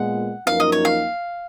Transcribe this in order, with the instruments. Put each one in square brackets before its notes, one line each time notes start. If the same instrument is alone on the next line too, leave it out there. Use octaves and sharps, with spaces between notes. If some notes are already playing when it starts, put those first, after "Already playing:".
Already playing: [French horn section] A#2 G#3 B3 [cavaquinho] F#5
[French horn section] F#2 F3 A#3 D#4 A#4 [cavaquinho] F5
[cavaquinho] D#5
C#5
F5